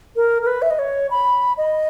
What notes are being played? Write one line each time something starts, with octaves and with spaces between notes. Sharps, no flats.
A#4
A#4
B4
E5
D#5
C#5
B5
D#5